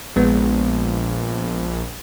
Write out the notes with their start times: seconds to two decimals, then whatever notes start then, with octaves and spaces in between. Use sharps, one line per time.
0.16 A#1 G#3 B3